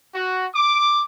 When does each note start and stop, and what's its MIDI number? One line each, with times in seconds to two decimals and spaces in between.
0.15 0.45 66
0.53 1.05 86